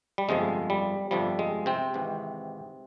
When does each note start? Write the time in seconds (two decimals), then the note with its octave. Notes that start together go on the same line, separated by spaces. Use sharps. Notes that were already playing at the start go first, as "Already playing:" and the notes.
0.18 G3
0.28 G1 F2 C3 F3 G#3
0.70 G3
1.11 G1 F2 C3 F3 G3
1.39 G#3
1.66 C3 C4
1.94 G#1 G#2 E3